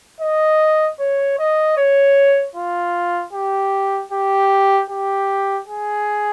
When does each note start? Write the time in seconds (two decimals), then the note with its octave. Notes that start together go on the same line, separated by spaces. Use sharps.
0.20 D#5
0.99 C#5
1.38 D#5
1.77 C#5
2.55 F4
3.33 G4
4.12 G4
4.90 G4
5.68 G#4